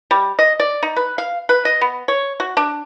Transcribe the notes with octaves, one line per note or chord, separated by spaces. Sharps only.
G3
D#5
D5
D#4
B4
F5
B4
D#5
B3
C#5
F#4
D4